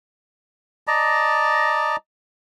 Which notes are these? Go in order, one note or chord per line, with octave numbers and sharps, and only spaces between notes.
D5 D#5 A5 A#5